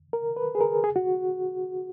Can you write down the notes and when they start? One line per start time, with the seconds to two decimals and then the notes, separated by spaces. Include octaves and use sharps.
0.13 A#4
0.36 B4
0.55 G#4
0.61 A#4
0.84 G#4
0.96 F#4